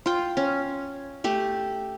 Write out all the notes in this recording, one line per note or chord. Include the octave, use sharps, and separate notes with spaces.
F4 G5
C#4
A3 G4